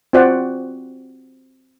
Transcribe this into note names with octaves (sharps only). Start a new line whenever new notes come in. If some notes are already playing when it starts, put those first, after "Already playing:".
C4 F4 F#4 C5 D5 F#5